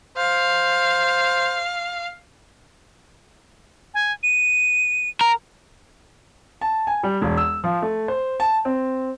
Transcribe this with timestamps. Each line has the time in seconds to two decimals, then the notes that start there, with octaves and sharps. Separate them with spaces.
0.17 C5 F5
3.94 G#5
4.23 D#7
5.21 A#4
6.61 A5
6.87 G#5
7.03 G3
7.22 E1
7.37 E6
7.64 F3
7.82 A3
8.08 C5
8.40 A5
8.65 C4